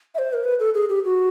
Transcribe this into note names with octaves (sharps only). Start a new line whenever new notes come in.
E5
C5
A#4
B4
A4
G#4
G4
F#4